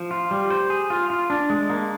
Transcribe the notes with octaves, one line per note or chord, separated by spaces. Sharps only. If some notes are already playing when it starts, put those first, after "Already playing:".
Already playing: F3
F4
G3
C5
G#4
F4
F4
D4
G#3
A#3